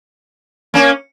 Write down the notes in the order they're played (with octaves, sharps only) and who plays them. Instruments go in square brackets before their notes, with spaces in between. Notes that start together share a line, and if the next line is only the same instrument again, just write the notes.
[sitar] A#3 C#4